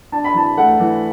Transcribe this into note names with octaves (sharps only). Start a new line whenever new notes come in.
D4 A5
B5
E3 A5
A3 F#5
E3